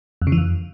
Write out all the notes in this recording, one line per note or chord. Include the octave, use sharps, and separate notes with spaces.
F2
C#3
E3
F2